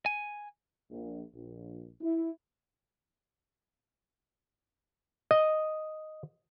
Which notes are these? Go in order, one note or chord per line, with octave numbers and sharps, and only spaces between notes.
G#5
A#1
A#1
E4
D#5